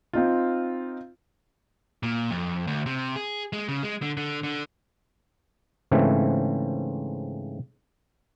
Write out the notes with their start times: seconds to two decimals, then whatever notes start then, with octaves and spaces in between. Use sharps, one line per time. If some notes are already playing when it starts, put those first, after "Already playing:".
0.13 C4 D#4 F4
2.03 A#2
2.31 F2
2.67 D2
2.86 C3
3.16 G#4
3.53 G#3
3.68 C#3
3.83 G#3
4.02 D3
4.17 D3
4.43 D3
5.91 G#2 C#3 E3 A3 C4